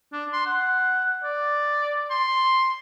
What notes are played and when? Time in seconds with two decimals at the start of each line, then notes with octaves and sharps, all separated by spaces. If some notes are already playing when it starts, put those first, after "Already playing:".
0.13 D4
0.33 C6
0.46 F#5
1.23 D5
2.11 C6